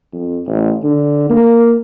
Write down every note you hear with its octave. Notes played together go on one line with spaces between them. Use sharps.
F2
A1
D3
A#3